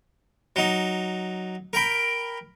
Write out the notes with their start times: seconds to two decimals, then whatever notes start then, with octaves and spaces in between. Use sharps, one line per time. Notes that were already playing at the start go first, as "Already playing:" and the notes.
0.56 F#3 D#4
1.73 A#4 G5 B5